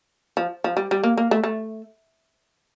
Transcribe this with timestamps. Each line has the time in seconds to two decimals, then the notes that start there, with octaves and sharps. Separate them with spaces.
0.37 F3
0.64 F3
0.77 G3
0.91 G3
1.04 A#3
1.17 A#3
1.31 A3
1.44 A3